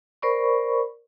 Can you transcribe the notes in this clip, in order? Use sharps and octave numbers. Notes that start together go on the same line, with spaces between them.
A#4 C5 D5 B5 C#6